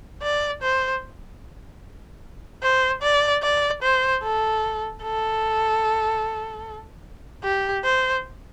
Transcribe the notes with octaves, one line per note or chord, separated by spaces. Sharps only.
D5
C5
C5
D5
D5
C5
A4
A4
G4
C5